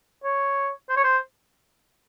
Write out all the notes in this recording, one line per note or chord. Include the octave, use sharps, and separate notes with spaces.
C#5
C5
C#5
C5